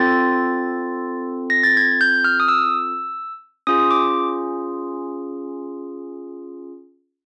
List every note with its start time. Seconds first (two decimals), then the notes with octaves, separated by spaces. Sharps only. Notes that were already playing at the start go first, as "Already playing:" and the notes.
Already playing: C4 F4 A4 A6
1.50 A#6
1.63 A6
1.77 G#6
2.01 G6
2.24 F6
2.40 D#6
2.48 E6
3.67 C#4 F4 G#4 D#6
3.91 D6